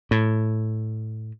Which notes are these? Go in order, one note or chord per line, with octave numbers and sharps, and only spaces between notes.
A2